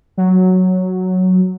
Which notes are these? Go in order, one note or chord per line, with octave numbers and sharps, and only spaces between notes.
F#3